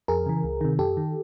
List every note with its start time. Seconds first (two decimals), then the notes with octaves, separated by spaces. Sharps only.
0.08 F2 G#4 A#4
0.26 C#3 E3
0.44 C#2
0.61 C3 D#3
0.79 F#2 G4 A4
0.97 D#3